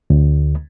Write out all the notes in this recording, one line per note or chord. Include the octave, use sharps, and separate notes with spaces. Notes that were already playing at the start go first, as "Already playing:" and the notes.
D2